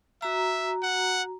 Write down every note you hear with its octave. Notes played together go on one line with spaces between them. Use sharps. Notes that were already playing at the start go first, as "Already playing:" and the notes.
F#4 E5 A#5
F#5